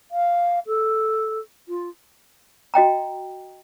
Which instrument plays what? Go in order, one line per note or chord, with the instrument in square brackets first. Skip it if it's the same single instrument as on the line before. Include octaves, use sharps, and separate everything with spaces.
[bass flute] F5
A4
F4
[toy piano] F#4 D#5 G5 A#5